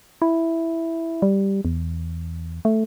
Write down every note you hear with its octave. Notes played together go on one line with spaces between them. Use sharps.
E4
G3
E2
A3